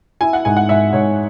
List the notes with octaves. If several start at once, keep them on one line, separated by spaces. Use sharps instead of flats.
E4 G#5
F#5
G#2 G#5
F#5
G#2 E5
G#2 C#5